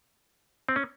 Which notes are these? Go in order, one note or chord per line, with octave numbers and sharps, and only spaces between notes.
C4
C#4